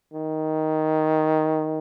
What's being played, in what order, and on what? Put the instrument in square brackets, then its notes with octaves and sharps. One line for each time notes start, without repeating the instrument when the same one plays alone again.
[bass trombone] D#3